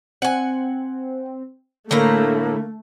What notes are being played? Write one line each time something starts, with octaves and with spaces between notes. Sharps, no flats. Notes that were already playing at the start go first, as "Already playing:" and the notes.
C4 F#5 G#5
A2 D3 A3 A#3 E4 A#5